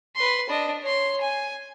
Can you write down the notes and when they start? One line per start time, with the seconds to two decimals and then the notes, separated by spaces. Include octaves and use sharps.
0.16 B4 C6
0.50 D4 D#5
0.82 C#5 C6
1.21 G#5